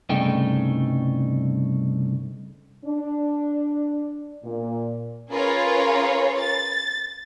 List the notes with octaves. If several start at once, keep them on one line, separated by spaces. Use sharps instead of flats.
C2 G2 C#3 A3 D#4 G5
D4
A#2
C#4 F4 G#4 A#4 B4 C#5
A6